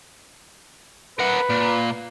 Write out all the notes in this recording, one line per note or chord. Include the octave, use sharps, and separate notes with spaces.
A#4 B4 F#5
A#2